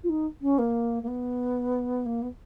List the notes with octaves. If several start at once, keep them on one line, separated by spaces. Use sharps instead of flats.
F4
D#4
C#4
A#3
A#3
B3
A#3
B3